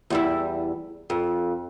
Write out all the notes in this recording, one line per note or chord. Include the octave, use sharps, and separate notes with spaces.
E2 G3 E4
F2